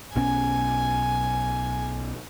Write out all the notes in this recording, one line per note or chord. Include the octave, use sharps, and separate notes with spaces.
B1 B2 C#4 G#5